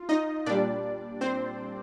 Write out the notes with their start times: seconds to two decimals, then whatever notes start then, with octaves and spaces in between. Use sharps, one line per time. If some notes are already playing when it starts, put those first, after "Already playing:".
Already playing: F4
0.09 D#4 D#5
0.46 A#2 G3 D4 D5
1.21 C4 C5